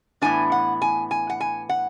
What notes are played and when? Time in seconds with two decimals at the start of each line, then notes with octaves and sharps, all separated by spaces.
0.22 A2 E3 B3 D4 G#5
0.52 F#5
0.82 G#5
1.11 G#5
1.30 F#5
1.40 G#5
1.69 F#5